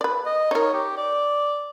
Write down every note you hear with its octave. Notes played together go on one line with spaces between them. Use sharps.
B4 D5
D#5
D#4 A#4 C#5
G4
D5